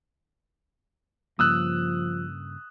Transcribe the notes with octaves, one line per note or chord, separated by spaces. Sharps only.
G2 C#3 F3 A#3 D#6 E6 F#6